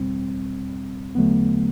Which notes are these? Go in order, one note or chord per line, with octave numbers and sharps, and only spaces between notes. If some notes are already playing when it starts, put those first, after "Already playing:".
Already playing: E2 B2 G3 C4
E2 D3 F#3 A3 B3